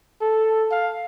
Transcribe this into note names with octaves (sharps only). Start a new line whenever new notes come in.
A4
F5